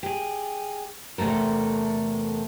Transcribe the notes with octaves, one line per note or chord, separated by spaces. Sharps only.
G4 G#4
E2 C3 A3 A4 A#4